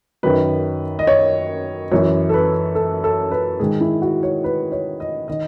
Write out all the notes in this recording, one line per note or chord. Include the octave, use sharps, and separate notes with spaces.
F#2 D#3 B4
D#5
C#5
F#2 E3 C#5
A4
B4
A4
A4
B4
G#2 D#3 G#4
E4
F#4
C#5
B4
C#5
D#5
D#3 D#5